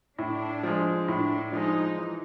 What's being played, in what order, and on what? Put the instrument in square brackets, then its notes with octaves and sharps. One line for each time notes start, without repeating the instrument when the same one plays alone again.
[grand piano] A2 [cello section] D4
[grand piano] F3 G#3
[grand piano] A2 [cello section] D4
[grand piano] F3 G#3 [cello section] D#4
[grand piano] E3